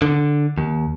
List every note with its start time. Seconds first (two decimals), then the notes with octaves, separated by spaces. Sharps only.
0.02 D3
0.58 D#2